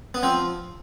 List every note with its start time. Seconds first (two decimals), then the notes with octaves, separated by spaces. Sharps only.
0.14 B3
0.23 F3 C4